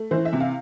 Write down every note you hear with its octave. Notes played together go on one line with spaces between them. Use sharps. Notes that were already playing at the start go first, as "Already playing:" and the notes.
Already playing: A3
E3 C5
E5
C3
F5